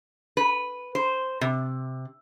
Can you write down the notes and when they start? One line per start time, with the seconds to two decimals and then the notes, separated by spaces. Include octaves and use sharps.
0.37 B4
0.95 C5
1.41 C3